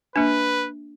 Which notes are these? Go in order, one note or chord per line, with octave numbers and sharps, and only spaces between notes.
A#3 D4 B4